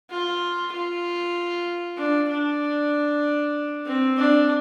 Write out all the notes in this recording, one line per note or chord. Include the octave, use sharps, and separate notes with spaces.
F4
F4
D4
D4
C4
D4